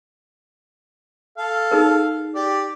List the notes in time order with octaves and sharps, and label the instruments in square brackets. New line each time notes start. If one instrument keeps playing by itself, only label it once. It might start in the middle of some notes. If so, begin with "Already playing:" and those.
[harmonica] A4 F5
[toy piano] D#4 G#4 A#4
[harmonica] G4 D5